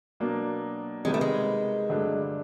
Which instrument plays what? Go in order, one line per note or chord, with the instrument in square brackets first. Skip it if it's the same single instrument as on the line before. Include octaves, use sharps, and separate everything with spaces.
[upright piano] B2 F#3 A#3 D4
[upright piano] C3 D#3 G3 B3 [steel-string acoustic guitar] G#3
[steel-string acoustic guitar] A3
G#3
[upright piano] G2 D3 F#3 A3 D4